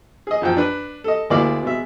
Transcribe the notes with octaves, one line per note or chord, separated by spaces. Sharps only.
G#4 D#5
F#2 F3 G5
D4 B4
A4 D#5
D2 G#3 A#3 E4 D5 F5
B2 G#3 E5